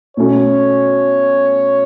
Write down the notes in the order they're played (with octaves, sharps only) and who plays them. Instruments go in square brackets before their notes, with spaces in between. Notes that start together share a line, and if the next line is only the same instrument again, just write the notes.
[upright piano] B2 A3 C#4 [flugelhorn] C#5